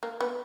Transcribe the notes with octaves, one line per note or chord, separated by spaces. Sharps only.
A#3
B3